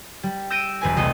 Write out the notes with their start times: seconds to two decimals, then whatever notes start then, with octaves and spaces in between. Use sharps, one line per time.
0.23 G3
0.50 E6 G6 A#6 D7 D#7
0.81 E1 B4 G#5
0.97 C2 A3 D#5